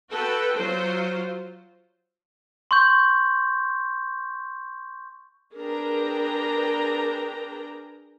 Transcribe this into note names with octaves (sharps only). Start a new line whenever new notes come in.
F#4 A4 B4 G5
F#3 F4 C5
C6 C#6 G6
D4 G#4 A#4 B4 G5 A#5